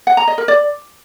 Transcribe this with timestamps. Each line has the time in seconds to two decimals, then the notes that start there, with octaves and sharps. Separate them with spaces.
0.07 F#5
0.17 A#5
0.28 D#5
0.38 A#4
0.48 D5